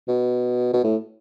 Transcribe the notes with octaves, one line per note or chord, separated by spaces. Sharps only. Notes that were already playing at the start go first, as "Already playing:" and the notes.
B2
B2
A2